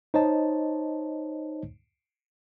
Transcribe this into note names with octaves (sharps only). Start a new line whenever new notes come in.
D#4 C5 C#5 D#5 A5